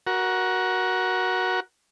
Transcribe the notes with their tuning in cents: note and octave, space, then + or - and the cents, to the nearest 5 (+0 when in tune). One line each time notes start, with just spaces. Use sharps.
F#4 +0 A#4 +25